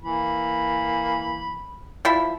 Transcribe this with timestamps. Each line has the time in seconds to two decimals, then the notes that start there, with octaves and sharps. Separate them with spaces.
0.02 E3 A#3 B5
2.05 F3 E4 B5